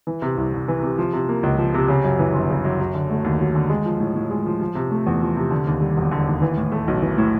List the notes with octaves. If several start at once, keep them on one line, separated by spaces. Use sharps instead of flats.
E3
C3
C2
C2
E3
C3
F3
C3
A#3
C#2
F3
C3
C#3
F#2
E3
G1
C#3
F#2
F#3
D3
A3
D#2
F#3
D3
G#3
F3
A2
A2
G#3
F3
F3
C3
A3
E2
F3
C3
D3
D#2
G3
E1
D3
D#2
E3
A2
A3
B1
E3
A2